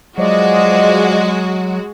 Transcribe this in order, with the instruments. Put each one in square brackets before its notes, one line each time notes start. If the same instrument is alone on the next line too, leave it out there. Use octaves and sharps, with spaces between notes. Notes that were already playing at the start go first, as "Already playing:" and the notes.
[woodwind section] F3 D5 D#5 [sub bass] F#3 [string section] G#3 F#4